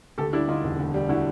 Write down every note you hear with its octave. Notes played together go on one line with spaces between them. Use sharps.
D2 G4 A4
G3 D4 E4
D3 D#4 F4
E1
D2
G3
D3 E4 F#4